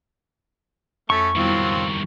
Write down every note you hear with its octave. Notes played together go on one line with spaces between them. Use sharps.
F2 A3 C#4 A4 C#6
G2 D#3 F#3 G3 B3 C4 E4 F4